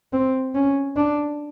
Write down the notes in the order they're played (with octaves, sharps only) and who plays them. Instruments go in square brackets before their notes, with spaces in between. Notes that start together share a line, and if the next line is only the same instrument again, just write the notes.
[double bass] C4
C#4
D4